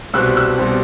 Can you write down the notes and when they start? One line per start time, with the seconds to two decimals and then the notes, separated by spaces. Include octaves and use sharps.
0.14 C2 B2 G3 C4 E6 F#6
0.37 E6 F#6
0.58 B2 G3 C4